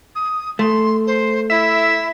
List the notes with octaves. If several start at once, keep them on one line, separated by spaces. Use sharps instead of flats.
D#6
A3 C6
C5
E4 E5